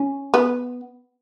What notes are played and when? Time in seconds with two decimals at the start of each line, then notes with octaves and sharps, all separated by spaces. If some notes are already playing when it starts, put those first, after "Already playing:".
Already playing: C#4
0.34 B3